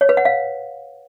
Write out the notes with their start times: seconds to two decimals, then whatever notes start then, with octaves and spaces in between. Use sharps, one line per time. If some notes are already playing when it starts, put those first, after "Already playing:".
0.01 C#5
0.09 B4
0.17 F#5
0.25 F5